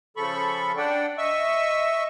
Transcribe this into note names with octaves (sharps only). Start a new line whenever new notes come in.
C#3 F3 A4 B5 C#6
D4 D5 F#5 G5
D#5 E5 C#6 E6